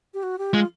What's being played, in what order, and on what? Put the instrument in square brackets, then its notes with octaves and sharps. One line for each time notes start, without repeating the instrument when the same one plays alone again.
[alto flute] G4
F#4
G4
[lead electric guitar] G#3 [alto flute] F4